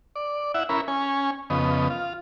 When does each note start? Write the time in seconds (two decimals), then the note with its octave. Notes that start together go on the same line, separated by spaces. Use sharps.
0.16 D5
0.54 E4 E5 F#5
0.69 C#4 E4 A#4 B5
0.88 C#4 G#5
1.50 F2 C#3 B3 D#5
1.90 F4